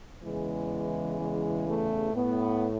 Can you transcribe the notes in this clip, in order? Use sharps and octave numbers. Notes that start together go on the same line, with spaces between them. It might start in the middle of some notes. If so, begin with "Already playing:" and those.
E2 C#3 E3 G#3
G#3
A3
A2 B3